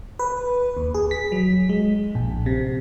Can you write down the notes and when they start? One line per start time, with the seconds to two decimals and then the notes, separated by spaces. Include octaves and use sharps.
0.19 B4
0.77 D#2
0.94 G#4
1.11 B6
1.32 F#3
1.69 G#3
2.15 A#1
2.46 C3